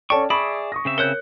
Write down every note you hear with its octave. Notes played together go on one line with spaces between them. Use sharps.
C#4 A4 D5 G5 A5 C#6
G#4 D5 E5 B5 C#6 D#6
C#6 D#6 A#6
C#3 C4 E5
A#4 C#5 F#6 G6 C#7